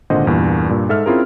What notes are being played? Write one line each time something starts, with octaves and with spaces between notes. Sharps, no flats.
G#1 A#2 D3 C5 D#5 F#5
E2 G2 A#2
G2 A#2
G#2 A4 E5 F6
C4 C#4 E4 F4 G#4 A#4